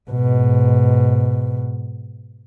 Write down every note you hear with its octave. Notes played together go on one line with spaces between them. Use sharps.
G#2 B2